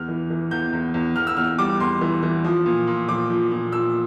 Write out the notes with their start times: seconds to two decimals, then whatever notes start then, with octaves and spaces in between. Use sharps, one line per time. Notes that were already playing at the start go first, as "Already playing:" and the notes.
Already playing: E2 F6
0.08 E3
0.30 E3
0.51 E2 G6
0.73 E2
0.94 E2
1.16 E2 F6
1.27 E6
1.37 E2 F6
1.59 G3 D6
1.80 E2 C6
2.01 E3
2.23 E3
2.44 F3
2.65 A#2
2.87 A#2
3.08 F3 D6
3.30 F3
3.51 A#2
3.72 F3 E6